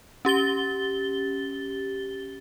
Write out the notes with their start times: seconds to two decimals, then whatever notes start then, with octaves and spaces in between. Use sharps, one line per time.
0.25 C#4 G4 A6 G7